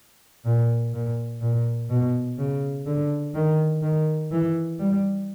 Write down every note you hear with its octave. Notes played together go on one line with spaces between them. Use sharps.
A#2
A#2
A#2
B2
C#3
D3
D#3
D#3
E3
G3